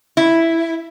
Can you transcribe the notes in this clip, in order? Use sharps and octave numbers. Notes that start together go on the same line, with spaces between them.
E4